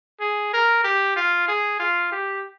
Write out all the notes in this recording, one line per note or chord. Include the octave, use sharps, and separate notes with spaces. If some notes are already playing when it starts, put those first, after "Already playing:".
G#4
A#4
G4
F4
G#4
F4
G4